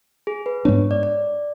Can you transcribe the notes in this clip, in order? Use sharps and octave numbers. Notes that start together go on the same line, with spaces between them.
G#4
B4
G#2 G#3 B3 D4 C#5
D5
D5